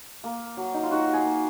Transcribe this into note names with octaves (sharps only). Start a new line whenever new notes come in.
A#3
F#3
D#4
F4
D#3 F#4
G#4
A#3